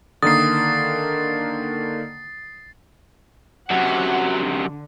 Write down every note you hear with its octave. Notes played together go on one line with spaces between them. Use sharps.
D3 D#3 A#3 D#6 A6 C7
F#2 C3 F#3 F#5
D3